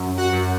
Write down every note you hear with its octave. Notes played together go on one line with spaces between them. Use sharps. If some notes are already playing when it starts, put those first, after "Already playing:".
Already playing: F#2
F#4 F#5
F#2